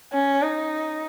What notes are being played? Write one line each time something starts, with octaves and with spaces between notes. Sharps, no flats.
C#4
D#4